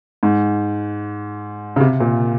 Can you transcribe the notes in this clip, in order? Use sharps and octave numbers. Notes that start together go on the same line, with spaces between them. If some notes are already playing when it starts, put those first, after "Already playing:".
G#2
C#3
C3
A#2